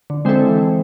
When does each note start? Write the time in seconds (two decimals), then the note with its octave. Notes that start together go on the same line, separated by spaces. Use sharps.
0.10 D3
0.25 D3 G#3 C4 E4 A4
0.48 E3